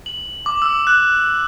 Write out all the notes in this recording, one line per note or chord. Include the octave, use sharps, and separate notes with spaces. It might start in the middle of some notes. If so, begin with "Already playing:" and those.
F#7
D6
E6
F#6